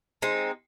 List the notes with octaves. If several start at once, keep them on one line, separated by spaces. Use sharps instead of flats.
G#3 C4 D#4